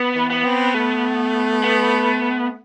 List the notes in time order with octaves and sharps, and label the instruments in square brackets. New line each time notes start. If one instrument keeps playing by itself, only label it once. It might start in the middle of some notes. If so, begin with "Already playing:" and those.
Already playing: [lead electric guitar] B3
[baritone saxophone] E3
[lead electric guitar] B3
[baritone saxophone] C4
A3
[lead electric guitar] B3